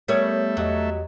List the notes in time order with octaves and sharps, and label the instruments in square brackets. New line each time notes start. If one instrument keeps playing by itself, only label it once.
[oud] G3 B3 C#5 [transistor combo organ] A3 E5 [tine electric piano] A#4
[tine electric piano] E2 G4 D#5 [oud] F#3